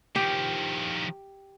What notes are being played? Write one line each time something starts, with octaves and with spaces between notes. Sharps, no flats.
D#3 F3 G4